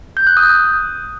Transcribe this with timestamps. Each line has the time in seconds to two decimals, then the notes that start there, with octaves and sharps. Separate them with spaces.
0.17 G6
0.27 F#6
0.37 D#6